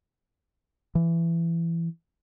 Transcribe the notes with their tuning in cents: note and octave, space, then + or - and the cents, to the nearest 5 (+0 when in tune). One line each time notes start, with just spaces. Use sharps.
E3 +20